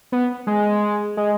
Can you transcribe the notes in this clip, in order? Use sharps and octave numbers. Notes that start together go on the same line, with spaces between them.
B3
G#3
G#3